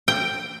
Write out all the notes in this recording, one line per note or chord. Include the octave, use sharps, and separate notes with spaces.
G5